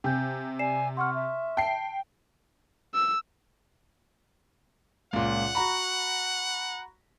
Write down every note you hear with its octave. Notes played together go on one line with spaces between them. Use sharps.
C3 G5 G#5 G6
D5 G#5 C7 E7
F#5 C6 C#6 F6
E5
G5 A5 C7
E6
C#2 A#2 F#5
F#4 A#5 B5